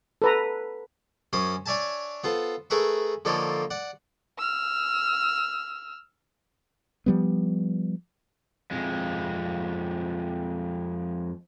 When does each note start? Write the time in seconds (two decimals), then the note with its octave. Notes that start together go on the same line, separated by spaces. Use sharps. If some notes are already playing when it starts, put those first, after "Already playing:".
0.22 A4 B4 A#5
1.33 F#2 C#4 C5 D6 D#6
1.66 D4 C#5 D5 E5 G#5 A5
2.24 B3 F4 A4 C5
2.70 A3 G#4 A#4 B4 E5 C#6
3.25 D3 F3 A#3 D#4 A4 C#5
3.70 D5 F#5
4.38 E6 F6
7.06 F3 G3 B3
8.71 F2 G#3